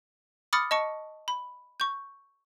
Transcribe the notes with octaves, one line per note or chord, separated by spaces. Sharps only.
B5 D6 D#6 F6 A6 C#7
D#5 A5 C#6 C#7
B5
C#6 G6